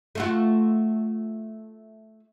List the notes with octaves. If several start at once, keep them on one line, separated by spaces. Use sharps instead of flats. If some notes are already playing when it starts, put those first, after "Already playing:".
A3 F4 F#4